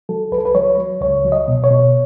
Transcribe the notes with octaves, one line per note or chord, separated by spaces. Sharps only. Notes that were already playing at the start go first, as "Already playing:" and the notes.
F#3 A4
C#2 B4
A4
B4
F#3 C#5
F#3
C#2 C#5
F#3
D#5
B2
C#5
B2